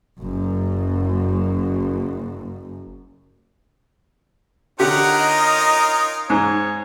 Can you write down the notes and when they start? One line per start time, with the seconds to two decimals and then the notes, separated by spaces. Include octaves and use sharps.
0.20 F#1 F#2
4.80 D3 C#4 D#4 F4 G4 A#4 F#5
5.18 D#5
6.30 G#2 G#4 C#5